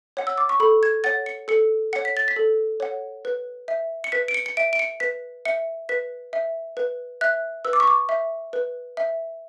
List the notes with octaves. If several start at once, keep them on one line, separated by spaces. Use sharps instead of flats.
C#5 F#5
E6
D6
C#6
A4 B5
G#6
C#5 F#5 A6
C#7
A4 C#7
C#5 F#5 C#7
B6
A6
B6
A4
C#5 F#5
B4
E5
C#7
B4 B6
D7
C#7
C#7
E5 D7
D7
C#7
B4 B6
E5 C#7
B4 B6
E5
B4
E5 F#6
B4 E6
D6
C#6
D6
E5
B4
E5